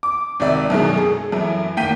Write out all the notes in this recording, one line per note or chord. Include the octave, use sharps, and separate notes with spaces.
D6
G#1 C3 D5 E5
F#2 B2 D#3 G#3
G#4 A4
F#2 E3
G#1 A#3 G5 B6 D#7